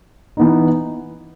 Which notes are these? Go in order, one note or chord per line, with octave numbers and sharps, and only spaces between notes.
E3 B3 D#4